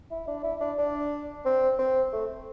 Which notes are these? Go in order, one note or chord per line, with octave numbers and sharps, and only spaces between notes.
E4
D4
E4
D4
D4
C4
C4
A3